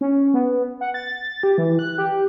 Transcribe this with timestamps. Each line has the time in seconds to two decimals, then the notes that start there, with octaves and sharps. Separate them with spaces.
0.01 C#4
0.34 B3
0.81 F#5
0.94 A6
1.43 G4
1.58 E3
1.79 F#6
1.98 G4